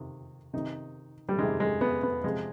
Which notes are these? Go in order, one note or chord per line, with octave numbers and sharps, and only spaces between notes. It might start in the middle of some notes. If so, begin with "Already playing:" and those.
Already playing: C3 D#3
C3 D#3 D#4
G3
C3 D#3 G#3
G#3
B3
B3
C3 F3 G#3